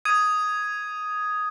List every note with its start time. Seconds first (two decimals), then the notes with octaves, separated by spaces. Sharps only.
0.05 D#6 G#6 D#7